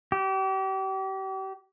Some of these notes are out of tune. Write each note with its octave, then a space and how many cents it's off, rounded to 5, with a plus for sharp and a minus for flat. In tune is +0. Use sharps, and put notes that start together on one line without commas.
G4 -35